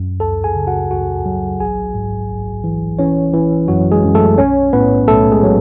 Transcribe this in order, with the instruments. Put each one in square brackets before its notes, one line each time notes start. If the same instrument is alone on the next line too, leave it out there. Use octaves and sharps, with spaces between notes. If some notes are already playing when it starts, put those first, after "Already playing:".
Already playing: [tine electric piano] F#2
C#2 A4 A5
G#4 G#5
C#3
F#4 F#5
C#2 F#4 F#5
F#3
A1 G#4 G#5
G#2
A1
E3
E3 C#4 C#5
E3
F#2 F#3 F#4
G#3 G#4
F#2
A3 A4
B1 C#4 C#5
A2 B3 B4
B1 A3 A4
G#3 G#4
F#3